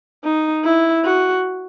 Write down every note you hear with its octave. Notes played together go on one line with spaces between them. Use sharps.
D#4
E4
F#4